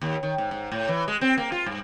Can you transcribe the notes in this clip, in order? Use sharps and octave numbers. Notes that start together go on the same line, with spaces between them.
D#2
D#3
G#2
G#2
A2
E3
G#3
C4
A#3
F4
G2